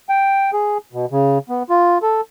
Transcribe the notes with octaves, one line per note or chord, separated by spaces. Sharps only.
G5
G#4
B2
C#3
B3
F4
A4